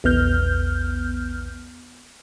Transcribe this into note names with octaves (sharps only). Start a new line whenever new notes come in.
A#1 E2 B3 F6 G6